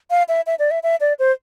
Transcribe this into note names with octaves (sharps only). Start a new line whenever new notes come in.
F5
E5
E5
D5
E5
E5
D5
C5